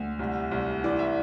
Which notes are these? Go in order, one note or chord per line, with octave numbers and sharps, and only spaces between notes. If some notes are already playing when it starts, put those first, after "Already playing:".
Already playing: D2
C2
C2
E3 D5
E5